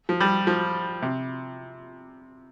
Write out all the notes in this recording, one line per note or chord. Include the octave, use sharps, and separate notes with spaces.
F3
G3
F3
C3